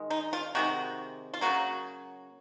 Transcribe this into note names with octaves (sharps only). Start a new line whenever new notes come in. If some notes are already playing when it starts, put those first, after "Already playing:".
Already playing: D#3 G#3
D#4
F4
C3 D#3 G#3 F#4
F4
C#3 F#3 A#3 F#4